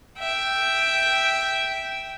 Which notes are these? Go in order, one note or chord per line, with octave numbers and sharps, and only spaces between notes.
E5 G5